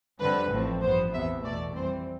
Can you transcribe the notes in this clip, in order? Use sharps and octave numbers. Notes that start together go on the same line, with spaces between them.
F2 D3 G3 C4 B4
A1 A2 F3 A3 C4
G2 F3 B3 C5
E2 C3 E3 B3 E5
E2 B2 A3 D5
F2 E3 G3 C4 C5